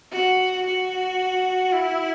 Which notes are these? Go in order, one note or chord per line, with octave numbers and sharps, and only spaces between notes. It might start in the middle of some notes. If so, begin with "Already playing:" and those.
F#4
F#4
E4